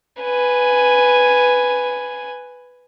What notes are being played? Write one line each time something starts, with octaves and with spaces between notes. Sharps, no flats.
B4 G#5